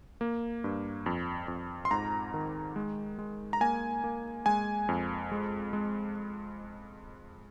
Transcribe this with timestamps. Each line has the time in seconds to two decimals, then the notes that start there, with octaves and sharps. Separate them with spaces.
0.21 A#3
0.64 G2
1.06 F2
1.48 F2
1.85 C6
1.91 G#2 A#5
2.34 D#3
2.76 G#3
3.19 G#3
3.53 A#5
3.61 A#3 G#5
4.04 A#3
4.46 G#3 G#5
4.89 F2
5.31 G#3
5.73 G#3